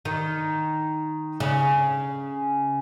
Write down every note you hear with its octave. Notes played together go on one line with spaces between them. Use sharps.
D#3
C#3